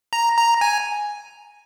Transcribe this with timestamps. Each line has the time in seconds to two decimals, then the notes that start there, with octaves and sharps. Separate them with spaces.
0.13 A#5
0.37 A#5
0.61 G#5